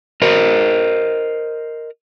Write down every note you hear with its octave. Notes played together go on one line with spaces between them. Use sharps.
A#4 C5 D#5